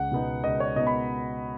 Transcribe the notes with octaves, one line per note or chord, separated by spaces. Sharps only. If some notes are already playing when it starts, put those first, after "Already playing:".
Already playing: C#2 F#5
B2 B3 D#4
C#2 D#5
C#5
B2 B3 D#4 D#5
B5